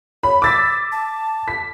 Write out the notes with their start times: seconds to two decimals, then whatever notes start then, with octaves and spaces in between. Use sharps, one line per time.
0.23 C#5 B5
0.42 D6 E6 A6 B6
0.92 A5
1.48 B6